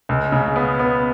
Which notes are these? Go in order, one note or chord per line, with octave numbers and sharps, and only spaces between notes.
C#2
C#3
B3
B3